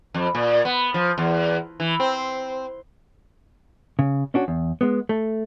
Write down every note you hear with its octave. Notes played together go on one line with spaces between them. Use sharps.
F2
A#2
B3
F3
E2
E3
C4
C#3
C#4 D4 F#4
E2
G#3 B3
A3